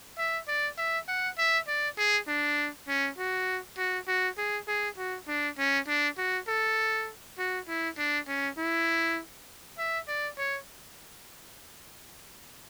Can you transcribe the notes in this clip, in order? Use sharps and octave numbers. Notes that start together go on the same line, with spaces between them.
E5
D5
E5
F#5
E5
D5
G#4
D4
C#4
F#4
F#4
F#4
G#4
G#4
F#4
D4
C#4
D4
F#4
A4
F#4
E4
D4
C#4
E4
E5
D5
C#5